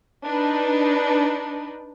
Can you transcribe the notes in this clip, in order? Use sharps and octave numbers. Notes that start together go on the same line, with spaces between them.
D4 D#4 B4